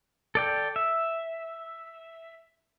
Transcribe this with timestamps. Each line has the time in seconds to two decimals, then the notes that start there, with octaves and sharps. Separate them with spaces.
0.35 A4 D5 G5
0.76 E5